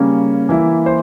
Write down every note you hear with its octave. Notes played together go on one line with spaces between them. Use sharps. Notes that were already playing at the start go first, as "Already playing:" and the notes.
Already playing: C#3 G3 A#3 C#4
E3 A#3 E4
C5